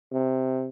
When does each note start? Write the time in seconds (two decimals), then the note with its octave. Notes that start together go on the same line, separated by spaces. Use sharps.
0.13 C3